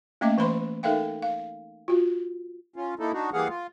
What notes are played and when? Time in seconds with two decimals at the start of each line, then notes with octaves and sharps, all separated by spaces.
0.21 A3 A#3 C#4 D#5 E5 D6
0.38 E3 B4 C5 B5 C6
0.83 D#4 A4 A#4 E5 F5 G5
1.22 F5
1.88 F4 F#4
2.76 C#4 F4
2.99 A#3 D#4 E4 A4
3.13 D4 D#4 F#4
3.33 E3 G3 A#3 G#4 F5 F#5
3.49 F4